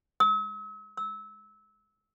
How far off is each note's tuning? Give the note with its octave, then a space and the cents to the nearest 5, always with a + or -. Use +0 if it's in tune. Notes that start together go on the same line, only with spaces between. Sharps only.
E6 -45
E6 -20